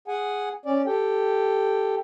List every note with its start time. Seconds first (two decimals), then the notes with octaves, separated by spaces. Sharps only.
0.08 G#4 F#5 G#5
0.66 C#4 D5
0.86 G4 A4 G5